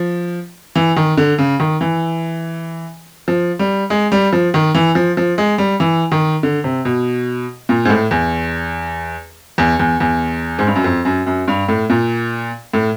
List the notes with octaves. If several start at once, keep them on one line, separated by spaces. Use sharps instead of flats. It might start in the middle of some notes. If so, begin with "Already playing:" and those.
Already playing: F3
E3
D#3
D3
C#3
D#3
E3
F3
G3
G#3
G3
F3
D#3
E3
F3
F3
G#3
G3
E3
D#3
D3
C3
B2
A#2
G#2
A2
E2
E2
E2
E2
G#2
G2
F#2
F2
F#2
F#2
G2
A2
A#2
A2